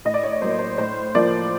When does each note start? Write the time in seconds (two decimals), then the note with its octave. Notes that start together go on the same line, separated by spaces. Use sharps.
0.05 A2 D#5
0.14 D5
0.23 C#5
0.32 D5
0.42 F#3 A#3 C5
0.50 C#5
0.59 C5
0.78 A2 C5
1.15 F3 A#3 D5